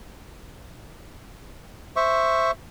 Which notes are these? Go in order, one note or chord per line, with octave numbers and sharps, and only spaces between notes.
C5 E5 C#6